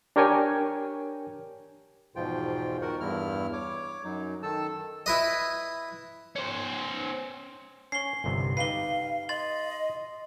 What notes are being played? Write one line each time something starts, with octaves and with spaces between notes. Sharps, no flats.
D4 G4 A#4 C#5 G5 G#5
E2 G#2 B2 F3 F4 G5
D#3 F#4 A#4 F#5
E2 G2 E4 F6
C#5 D6
F#2 F#3 D#4
D#3 A4 A5 E6
E4 B4 D#5
C#4 C5
C#4 C#5 C7 G7
G1 C2 C3
D#4 G4 B4 F5 C7 G7
D#5 C6 A6 F#7